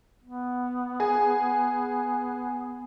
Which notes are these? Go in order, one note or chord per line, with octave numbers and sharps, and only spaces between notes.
B3
G#4